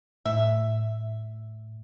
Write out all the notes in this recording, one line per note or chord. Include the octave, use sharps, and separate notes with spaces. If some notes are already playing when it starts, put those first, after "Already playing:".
A2 E5